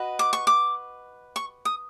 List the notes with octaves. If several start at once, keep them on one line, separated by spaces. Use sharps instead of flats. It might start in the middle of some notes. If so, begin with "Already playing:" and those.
Already playing: F#4 B4 D#5
D6
C#6
D6
C#6
D#6